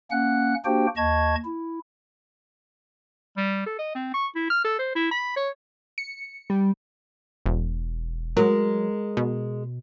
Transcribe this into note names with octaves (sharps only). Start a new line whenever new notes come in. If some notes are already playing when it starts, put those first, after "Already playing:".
A#3 C#4 F#5 F#6
A#3 D4 F#4 G4 C5 G5
D#2 D#5 A5 C#6 G#6
E4
G3
A4
D#5
C4
C#6
E4
F6
A4
C5
E4
B5
C#5
C#7
G3
E1
F#3 G#3 A#4
B2